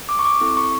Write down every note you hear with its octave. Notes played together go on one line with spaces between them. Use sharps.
D6
C#6
D6
C4 E4 A4
C#6